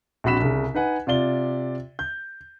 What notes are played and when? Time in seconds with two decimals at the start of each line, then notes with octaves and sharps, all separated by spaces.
0.24 A#1 C4 F#4 B5 B6 E7
0.40 C2 C#3
0.74 D#4 B4 F#5 G#5
1.07 C3 F4 D5 G7
1.99 G6